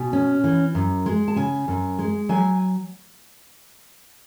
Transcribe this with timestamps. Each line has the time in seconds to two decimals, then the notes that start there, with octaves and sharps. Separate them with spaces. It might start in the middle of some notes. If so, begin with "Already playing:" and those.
Already playing: B2 G#5
0.13 C#4
0.44 E3
0.75 F#2
1.06 G#3
1.28 A5
1.36 C#3 G#5
1.68 F#2
1.99 G#3
2.29 F#3 G#5